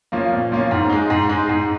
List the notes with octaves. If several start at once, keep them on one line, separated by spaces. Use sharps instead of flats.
F3 A#3 C#4 F4
A#2
F3 A#3 C#4 F4
G#2
G#3 D#4
G#2
G#3 D#4
G#2